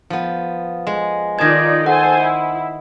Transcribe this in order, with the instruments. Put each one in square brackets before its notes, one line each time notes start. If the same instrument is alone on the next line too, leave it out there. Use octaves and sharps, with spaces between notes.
[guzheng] F3 B3
G#3
[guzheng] D#3 A5 [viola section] D#4 F4 D5 [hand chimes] G#6 A#6
[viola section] A4 C5 G#5 [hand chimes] F#5
[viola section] E4